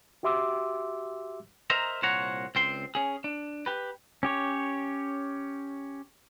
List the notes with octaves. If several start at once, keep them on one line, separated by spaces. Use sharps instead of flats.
F#4 G4 E5 C6 D6 E6
A#4 C5 D#5 E5 A#5
C2 A#2 C5 C#5 F#5 A#5
C#2 C4 C6
C#4 G#4
D4
G4 B4
C#4 G4 C#5